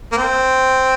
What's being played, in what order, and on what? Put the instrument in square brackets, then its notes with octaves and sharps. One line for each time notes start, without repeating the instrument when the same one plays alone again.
[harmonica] A#3
C4